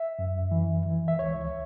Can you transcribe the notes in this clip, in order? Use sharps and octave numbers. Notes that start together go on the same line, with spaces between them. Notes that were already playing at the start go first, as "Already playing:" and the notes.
Already playing: E5
F#2
E3
E3
E5
C#2 C#5